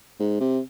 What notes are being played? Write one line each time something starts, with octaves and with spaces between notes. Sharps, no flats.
G#2
C3